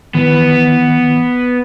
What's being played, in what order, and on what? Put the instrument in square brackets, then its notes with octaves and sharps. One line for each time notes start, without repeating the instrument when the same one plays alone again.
[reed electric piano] D#3 E3 [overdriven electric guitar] B3